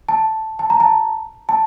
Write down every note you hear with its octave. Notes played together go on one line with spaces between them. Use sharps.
A5
A5
A#5
A5
A5